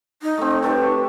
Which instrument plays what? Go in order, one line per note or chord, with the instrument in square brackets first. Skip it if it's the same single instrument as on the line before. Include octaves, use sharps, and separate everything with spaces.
[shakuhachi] D#4
[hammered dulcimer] A3 C4
C#5
[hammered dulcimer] G4 A4 C#6 [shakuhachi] B4